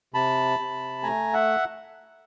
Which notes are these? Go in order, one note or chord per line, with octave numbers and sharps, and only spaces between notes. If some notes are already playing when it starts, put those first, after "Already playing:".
C3 A5 B5
C3
A3 G#5 A#5
E5 F#5